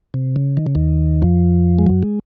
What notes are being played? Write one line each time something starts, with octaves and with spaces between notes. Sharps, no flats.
C3
C#3
D#3
C#3
D#2 D#3
F2 F3
G#3
F#2 F#3
G#3